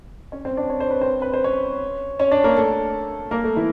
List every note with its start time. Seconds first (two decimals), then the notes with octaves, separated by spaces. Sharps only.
0.32 C#4 C#5
0.45 C4 C5
0.57 D4 D5
0.70 C#5
0.80 C5
0.91 B4
1.01 C4 C5
1.22 B4
1.33 C5
1.44 C#4 C#5
2.19 C#4 C#5
2.31 D4 D5
2.44 A#3 A#4
2.56 A3 A4
3.31 A#3 A#4
3.44 A3 A4
3.56 E3 E4